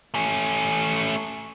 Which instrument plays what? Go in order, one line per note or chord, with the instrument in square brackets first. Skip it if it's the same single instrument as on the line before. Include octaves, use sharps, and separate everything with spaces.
[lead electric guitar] A3 C#4